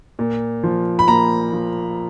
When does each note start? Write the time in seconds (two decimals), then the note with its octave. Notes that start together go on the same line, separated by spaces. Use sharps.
0.19 A#2
0.63 F3
0.99 B5
1.08 A#2 A#5
1.53 F3